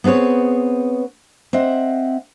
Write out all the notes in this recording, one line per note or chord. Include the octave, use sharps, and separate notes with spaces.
B3 C4 G#4 B4 C#5
C4 D#5 E5 F#5